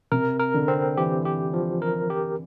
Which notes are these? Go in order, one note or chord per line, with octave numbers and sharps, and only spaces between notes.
C3 A#4
A#4
D3
C4
E3 G4
G4
F3
A#4
G4